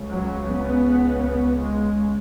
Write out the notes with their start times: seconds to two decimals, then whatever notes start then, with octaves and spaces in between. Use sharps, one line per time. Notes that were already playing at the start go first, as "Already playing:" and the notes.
Already playing: C#2 C#3
0.10 F#3
0.48 B3
1.22 B3
1.59 G#3